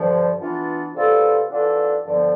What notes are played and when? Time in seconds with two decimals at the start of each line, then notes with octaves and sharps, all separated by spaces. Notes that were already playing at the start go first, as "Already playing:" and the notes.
Already playing: G2 D3 F3
0.40 E3 B3 D4 F4
0.95 C3 G3 B3 F4 A4
1.50 E3 B3 D4 F4 A4
2.05 G2 D3 F3 B3